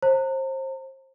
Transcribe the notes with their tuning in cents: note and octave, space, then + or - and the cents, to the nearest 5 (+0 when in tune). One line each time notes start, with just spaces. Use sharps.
C5 +30 A#5 -35